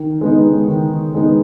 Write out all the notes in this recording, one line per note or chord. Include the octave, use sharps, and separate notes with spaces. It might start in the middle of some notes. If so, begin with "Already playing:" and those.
Already playing: D#3
G#3 B3 D#4
D#3
G#3 B3 D#4